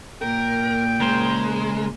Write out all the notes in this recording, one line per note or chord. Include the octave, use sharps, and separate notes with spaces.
A#2 A#4 G5
C#3 G#3 A#4 C5